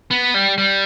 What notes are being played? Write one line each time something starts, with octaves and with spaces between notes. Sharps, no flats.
B3
G3
G3